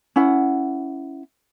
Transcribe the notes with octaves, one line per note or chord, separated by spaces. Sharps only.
C#4 E4 F#5